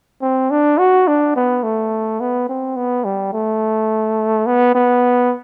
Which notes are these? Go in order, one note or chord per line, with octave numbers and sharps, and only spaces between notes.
C4
D4
F#4
D4
B3
A3
B3
C4
B3
G3
A3
B3
B3